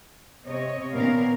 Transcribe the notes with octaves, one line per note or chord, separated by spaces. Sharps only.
C3 C4 C#5 D#5
A#2 D#3 B3 C#4 A#4 F5